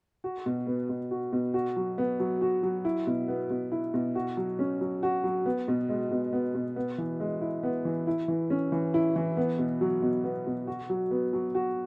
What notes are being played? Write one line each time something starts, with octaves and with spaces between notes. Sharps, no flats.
F#4
B2
B3
B2
F#4
B2
F#4
F#3
B3
F#3
F#4
F#3
E4
B2
B3
B2
E4
B2
F#4
F#3
C#4
F#3
F#4
F#3
B3
B2
G#3
B2
B3
B2
B3
E3
G#3
E4
B3
E3
E4
E3
C#4
E3
E4
E3
B3
B2
F#3
B2
B3
B2
F#4
F#3
B3
F#3
F#4